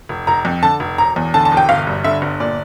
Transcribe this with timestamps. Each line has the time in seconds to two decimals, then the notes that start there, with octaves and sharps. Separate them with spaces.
0.09 F1
0.27 F1 A#5
0.45 F2
0.62 D3 A5
0.80 F1
0.98 E1 A#5
1.16 E2
1.34 D3 A5
1.45 A5
1.51 E1
1.57 G5
1.69 G1 F5
1.87 G2
2.04 D3 E5
2.22 G1
2.40 A#2 D5